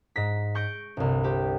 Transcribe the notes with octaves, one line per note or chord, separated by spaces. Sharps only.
G#2 A#6 B6
C#6 G6 A#6 D7
G1 C2
C4 G4